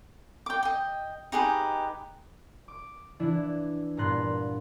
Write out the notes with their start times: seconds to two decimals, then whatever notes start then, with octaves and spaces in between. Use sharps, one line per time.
0.46 G5 D6
0.63 D#5 G5
1.32 D#4 G4 G#4 B4
2.68 D6
3.20 E3 D4 E4
3.97 G2 A#2 B3 A#5 C6 F#6